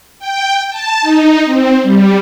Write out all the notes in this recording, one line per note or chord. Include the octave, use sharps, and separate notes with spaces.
G5
A5
D#4
C4
G3